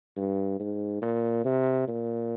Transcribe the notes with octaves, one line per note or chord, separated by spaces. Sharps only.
G2
G#2
A#2
C3
A#2